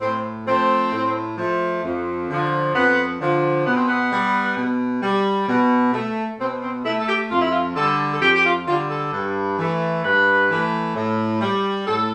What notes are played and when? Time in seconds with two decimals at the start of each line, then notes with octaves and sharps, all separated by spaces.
0.01 A2 C4
0.47 F3 A3 C4
0.92 A2
1.38 F3 A3
1.83 F2
2.30 D3 F3
2.74 F2 B3
3.20 D3 F3
3.65 B2 B3
3.76 C4
3.87 B3
4.12 G3
4.57 B2
5.03 G3
5.48 B2
5.93 A3
6.39 B2 C4
6.62 C4
6.85 A3 E4
7.00 A4
7.08 G4
7.30 F2 F4
7.40 E4
7.50 F4
7.75 D3 G3 A4
8.14 A4
8.21 F2 G4
8.34 G4
8.45 F4
8.67 D3 F4
8.71 G3
8.89 A4
9.13 G2
9.58 E3 A3
10.04 G2 B4
10.49 E3 A3
10.95 A2
11.41 G3
11.86 A2 A4